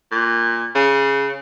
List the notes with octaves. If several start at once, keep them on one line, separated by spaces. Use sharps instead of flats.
A#2
C#3